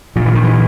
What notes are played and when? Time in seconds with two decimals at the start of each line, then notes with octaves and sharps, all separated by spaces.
0.16 A#2 F3
0.26 E3
0.35 D#3
0.44 E3